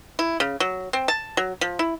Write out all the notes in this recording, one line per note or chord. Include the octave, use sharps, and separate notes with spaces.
E4
C#3
F#3
C4
A5
F#3
F3
E4